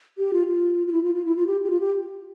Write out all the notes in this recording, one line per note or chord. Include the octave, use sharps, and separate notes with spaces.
G4
F4
F4
F4
E4
F4
F4
E4
F4
G4
G4
F4
G4